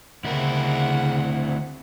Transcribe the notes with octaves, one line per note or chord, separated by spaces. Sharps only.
D2 C#3 C4 E4 A#4 F#5